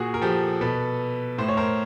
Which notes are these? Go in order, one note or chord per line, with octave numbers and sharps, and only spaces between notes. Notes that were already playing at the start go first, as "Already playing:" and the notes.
Already playing: A#2 F#4 G#4
A#4
F3 G4 A4
B2 A4 B4
A2 C5
C#5
A#4 C5